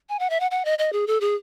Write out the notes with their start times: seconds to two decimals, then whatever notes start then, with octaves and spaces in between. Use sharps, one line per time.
0.09 G#5
0.19 F#5
0.30 E5
0.40 F#5
0.51 F#5
0.65 D#5
0.79 D#5
0.93 G#4
1.07 A4
1.21 G#4